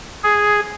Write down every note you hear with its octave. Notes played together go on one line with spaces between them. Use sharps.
G#4